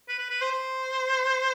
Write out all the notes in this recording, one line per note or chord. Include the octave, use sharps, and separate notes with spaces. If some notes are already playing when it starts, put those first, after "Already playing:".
B4
B4
B4
C5
C5